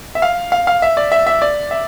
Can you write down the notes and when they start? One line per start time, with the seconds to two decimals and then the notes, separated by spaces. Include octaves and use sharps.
0.15 E5
0.22 F5
0.52 F5
0.67 F5
0.82 E5
0.97 D5
1.12 E5
1.27 E5
1.42 D5
1.71 E5